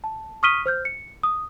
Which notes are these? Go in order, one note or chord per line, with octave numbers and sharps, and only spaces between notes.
A5
C#6 D#6 F6 B6 D#7 G7
C5 F6 G6
C#7
D#6